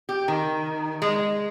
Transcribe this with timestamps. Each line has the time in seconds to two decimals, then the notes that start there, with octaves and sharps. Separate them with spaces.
0.09 G4
0.28 D#3
1.02 G#3